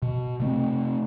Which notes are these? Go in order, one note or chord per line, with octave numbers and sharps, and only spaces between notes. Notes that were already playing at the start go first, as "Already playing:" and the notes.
B2
C3 A3 C4